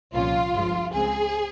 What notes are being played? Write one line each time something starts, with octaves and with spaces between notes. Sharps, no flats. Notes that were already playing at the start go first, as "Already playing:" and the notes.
C2 A#2 F3 A#3 C#4 F4
G1 G2 F3 G#3
C#2 C#3 G#3 C4 G#4